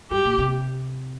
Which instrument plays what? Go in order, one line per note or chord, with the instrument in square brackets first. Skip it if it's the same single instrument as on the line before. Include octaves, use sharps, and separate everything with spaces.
[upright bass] G2 [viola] G4
[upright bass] A#2
C3